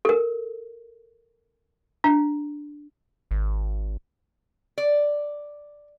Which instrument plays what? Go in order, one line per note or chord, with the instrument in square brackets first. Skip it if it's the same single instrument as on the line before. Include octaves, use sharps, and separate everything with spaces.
[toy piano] A4 A#4
[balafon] D4
[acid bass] G#1
[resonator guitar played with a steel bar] D5